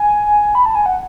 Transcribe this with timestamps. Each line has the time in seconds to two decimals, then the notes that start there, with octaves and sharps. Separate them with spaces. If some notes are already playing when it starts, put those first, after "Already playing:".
Already playing: G#5
0.55 B5
0.66 A5
0.75 G#5
0.86 F#5